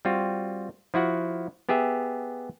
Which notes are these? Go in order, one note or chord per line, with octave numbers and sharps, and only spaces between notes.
G3 C4 F4 F#4
F3 E4 F#4 F#5
B3 G4 G#4 E5